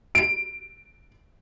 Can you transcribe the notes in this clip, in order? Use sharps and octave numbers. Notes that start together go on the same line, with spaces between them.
D7